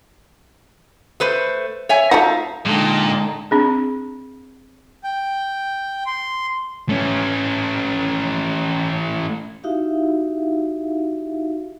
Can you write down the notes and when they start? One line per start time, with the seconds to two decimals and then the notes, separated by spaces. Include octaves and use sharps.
1.20 A3 B4 C5
1.89 C#5 E5 G#5
2.11 A3 D#4 F4 F#4 E5
2.66 A#2 D3 G#3 D#4 A4 D#5 G5 A5
3.51 C4 D4 G#4
5.04 G5
6.06 C6
6.89 A3 C#4
9.64 D#4 E4 F#4 G4 E5 F5